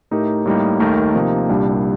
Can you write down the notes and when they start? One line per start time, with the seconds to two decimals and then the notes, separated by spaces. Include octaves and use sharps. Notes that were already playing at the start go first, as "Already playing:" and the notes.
0.11 A2 A3 D#4 G4 A#4
0.46 A2 G3 A#3 D#4
0.80 D#2 D#3 A3 D#4 A#4
1.15 C3 F3 A#3 D#4
1.49 C2 A#2 G3 D4 G4